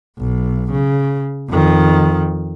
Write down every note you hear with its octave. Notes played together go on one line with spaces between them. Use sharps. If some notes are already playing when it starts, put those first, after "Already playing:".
B1
C#3
F2 D#3